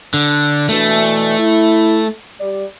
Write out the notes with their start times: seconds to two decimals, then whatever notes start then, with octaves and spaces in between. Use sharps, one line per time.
0.14 D3
0.69 B2 E3 A3 D4
1.38 E4
2.40 G3 D5